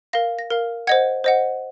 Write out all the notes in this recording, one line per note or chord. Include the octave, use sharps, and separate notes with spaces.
A#4 F5 A#6
A#6
A#4 F5
C5 D#5 F#5 G#6
C5 D#5 F#5